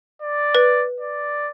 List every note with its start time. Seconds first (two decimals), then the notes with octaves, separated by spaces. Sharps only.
0.22 D5
0.55 B4
1.00 D5